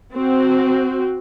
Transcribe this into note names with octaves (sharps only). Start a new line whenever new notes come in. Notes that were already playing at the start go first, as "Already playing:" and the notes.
C4 F#4